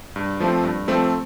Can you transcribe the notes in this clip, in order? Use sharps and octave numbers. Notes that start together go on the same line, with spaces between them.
G2
F3 A3 C4
G2
F3 A3 C4